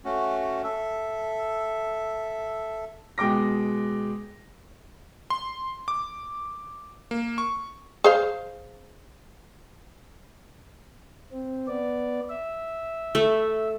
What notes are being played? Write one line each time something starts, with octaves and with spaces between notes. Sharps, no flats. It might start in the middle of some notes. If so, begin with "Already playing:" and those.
A3 C#4 F#4
A4 E5
B2 G#3 G5 D6 A#6
C6
D6
A#3
C#6
G#4 C5 F5
C4
B3 D5
E5
A3